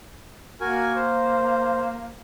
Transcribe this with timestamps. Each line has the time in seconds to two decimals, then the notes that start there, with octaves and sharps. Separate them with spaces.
0.61 A#3 F#4 A#4 G#5
0.95 C5